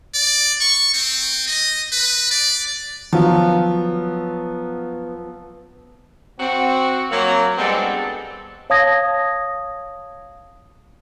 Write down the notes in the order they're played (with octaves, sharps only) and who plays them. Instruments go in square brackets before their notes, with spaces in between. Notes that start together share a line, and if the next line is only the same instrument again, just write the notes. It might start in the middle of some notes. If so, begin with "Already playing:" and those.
[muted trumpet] D5
C#6
C4
D#5
B4
D5
[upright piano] F3 F#3 F4 [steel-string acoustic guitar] B3
[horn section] C4 F#4
F#3 A#3 C4
G3 G#3 B3 C4 D4 A4
[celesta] C#5 F5 A5 D#6 G#6 A#6